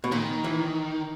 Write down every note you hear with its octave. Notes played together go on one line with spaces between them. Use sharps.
B2
A#2 D#3
E3